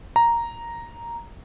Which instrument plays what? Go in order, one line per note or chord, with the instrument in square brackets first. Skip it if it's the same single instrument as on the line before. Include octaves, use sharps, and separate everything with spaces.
[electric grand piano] A#5